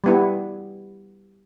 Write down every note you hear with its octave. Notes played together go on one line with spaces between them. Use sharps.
G3 B3 E4